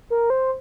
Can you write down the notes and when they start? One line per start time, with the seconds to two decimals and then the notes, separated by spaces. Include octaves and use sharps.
0.10 A#4
0.30 C5